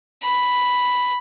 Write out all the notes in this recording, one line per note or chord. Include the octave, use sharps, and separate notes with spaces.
B5